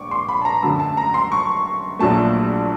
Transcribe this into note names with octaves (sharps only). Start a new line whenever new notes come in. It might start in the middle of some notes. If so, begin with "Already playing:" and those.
Already playing: A#1 C#6 D6
C6
B5
A5
A#5
F#2 D3 F#3 A3 A5
A5
A#5
C6
C#6
A#1 A#2 F#3 A3 A5